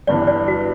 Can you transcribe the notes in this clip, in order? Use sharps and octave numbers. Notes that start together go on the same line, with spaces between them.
G1 G2 E3 D5
D5
F#4